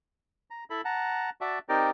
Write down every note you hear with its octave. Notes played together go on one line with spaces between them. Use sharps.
A#5
E4 A4 B5
F#5 A5 A#5
F#4 D5 E5 A5
C4 D#4 G4 A#4 D5